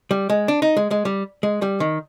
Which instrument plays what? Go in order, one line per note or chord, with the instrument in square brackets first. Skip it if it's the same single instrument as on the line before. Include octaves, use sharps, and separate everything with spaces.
[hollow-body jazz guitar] G3
G#3
D4
D#4
G#3
G#3
G3
G#3
G3
D#3